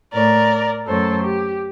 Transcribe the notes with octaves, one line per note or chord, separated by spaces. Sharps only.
A2 A3 A#4 D5
F#2 F#3 A3 A4 C5
G4